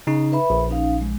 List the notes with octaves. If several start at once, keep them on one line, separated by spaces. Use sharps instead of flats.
C#3 D#4
B4 E5 B5
A#1
C#4 D#4 F5
G#3